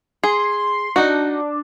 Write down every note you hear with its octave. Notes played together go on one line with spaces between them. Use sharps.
G#4 C6
D4 D#4 F#4